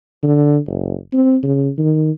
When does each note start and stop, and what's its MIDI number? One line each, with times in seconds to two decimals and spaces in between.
0.23 0.58 50
0.67 0.96 30
1.13 1.37 60
1.43 1.70 49
1.78 2.11 51